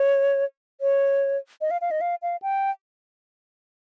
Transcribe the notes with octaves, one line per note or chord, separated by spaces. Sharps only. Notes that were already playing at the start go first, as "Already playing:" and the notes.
Already playing: C#5
C#5
D#5
F5
F5
D#5
F5
F5
G5